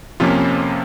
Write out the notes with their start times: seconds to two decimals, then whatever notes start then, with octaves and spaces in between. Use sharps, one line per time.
0.20 F2 C3 F3 A#3 C#4 F4